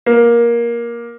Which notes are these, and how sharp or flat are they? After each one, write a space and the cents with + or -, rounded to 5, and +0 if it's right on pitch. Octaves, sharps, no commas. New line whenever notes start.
A#3 +15